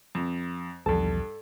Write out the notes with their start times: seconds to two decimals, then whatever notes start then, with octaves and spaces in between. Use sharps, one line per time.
0.15 F2
0.86 B1 E2 G2 F3 A4 A5